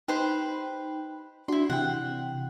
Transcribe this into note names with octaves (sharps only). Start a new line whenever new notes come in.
D#4 G4 B4 C5 G5 B5
D4 E4 F#4 C6
C3 E3 F#5 G5